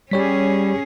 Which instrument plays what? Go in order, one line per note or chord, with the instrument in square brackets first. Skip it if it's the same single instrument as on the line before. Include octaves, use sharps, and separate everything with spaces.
[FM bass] G3 [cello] C#4 G#4 [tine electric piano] G4 C#5 B6